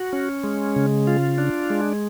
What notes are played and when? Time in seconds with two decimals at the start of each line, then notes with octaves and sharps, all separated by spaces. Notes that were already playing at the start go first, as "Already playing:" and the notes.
Already playing: F#4
0.13 C#4
0.44 G#3
0.76 C#3
1.07 F4
1.38 D4
1.70 G#3